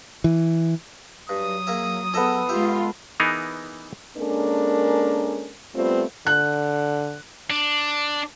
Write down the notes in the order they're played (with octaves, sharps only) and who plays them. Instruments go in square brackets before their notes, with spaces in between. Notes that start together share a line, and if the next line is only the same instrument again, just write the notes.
[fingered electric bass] E3
[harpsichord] G2 [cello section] F#3 [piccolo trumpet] D#6
[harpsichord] A#3 G#4 E5
[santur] B3 A4 E6 [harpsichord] G#4 D#5 E5
[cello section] G#3 F4 [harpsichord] G4 E5
[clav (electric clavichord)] E3 B3 D#4 G#4 A#4
[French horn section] G#3 A#3 C#4 D4 A4 A#4
G3 A3 B3 C4 F4
[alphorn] D3 [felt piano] F#6
[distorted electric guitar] D4